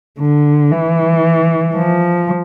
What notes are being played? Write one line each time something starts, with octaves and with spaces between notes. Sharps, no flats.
D3
E3
F3